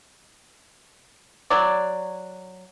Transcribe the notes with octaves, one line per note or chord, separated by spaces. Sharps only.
F#3 D5